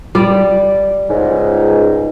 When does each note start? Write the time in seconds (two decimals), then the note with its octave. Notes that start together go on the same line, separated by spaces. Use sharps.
0.15 G3 D5
1.09 C#2 G#2